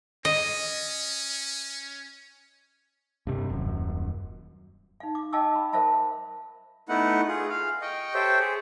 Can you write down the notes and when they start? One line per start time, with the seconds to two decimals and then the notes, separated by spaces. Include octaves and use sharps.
0.25 C#4 D#5
3.27 G2 C3
3.49 D#1 F#2
5.00 D#4 F5
5.15 D6
5.33 D#5 F5 G5 A5 D6 E6
5.56 B5
5.73 A#4 C5 E5 F5 A5 B5
6.89 A3 B3 D#4 E4 F#5
7.28 F4 G#4
7.50 F5
7.82 D#5 G5 C#6
8.14 G4 A4 C5 C#5 E5 G5
8.40 G#4